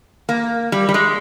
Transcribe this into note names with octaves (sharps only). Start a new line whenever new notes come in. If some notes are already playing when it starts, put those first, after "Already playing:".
A#3
G3
G3
G#3